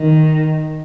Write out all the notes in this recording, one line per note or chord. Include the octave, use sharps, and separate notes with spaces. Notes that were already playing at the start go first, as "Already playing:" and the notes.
Already playing: D#3